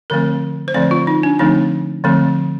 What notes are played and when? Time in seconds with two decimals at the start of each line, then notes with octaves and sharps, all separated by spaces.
0.10 D3 F3 A3 C4 A#4
0.68 C5
0.74 D3 F3 A3 C4 D5
0.91 F4
1.07 D#4
1.23 D4
1.39 D3 F3 A3 C4 D#4
2.04 D3 F3 A3 C4